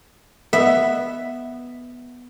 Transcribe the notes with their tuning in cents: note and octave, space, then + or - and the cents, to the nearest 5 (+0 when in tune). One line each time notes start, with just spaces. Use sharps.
B3 +0 E5 +0